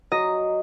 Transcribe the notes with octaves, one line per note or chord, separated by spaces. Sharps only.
F#3 D#5